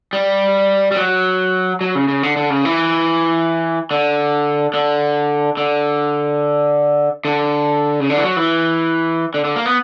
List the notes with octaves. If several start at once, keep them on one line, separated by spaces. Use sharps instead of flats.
G3
G3
F#3
F#3
C#3
C#3
D3
D3
C#3
E3
D3
D3
D3
D3
C#3
D3
E3
F#3
E3
D3
D3
A#3
B3